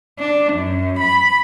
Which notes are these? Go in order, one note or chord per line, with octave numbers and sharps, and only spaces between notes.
D4
F#2
B5